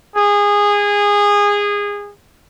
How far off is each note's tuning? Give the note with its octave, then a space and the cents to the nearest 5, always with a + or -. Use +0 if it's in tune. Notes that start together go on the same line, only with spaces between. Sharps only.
G#4 -20